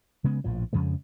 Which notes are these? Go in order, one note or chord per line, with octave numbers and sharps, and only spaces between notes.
C#3 G#3 B3
A#1 A2 F3
F2 C#3 F3 G#3